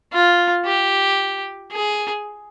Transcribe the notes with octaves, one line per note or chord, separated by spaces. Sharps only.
F4
G4
G#4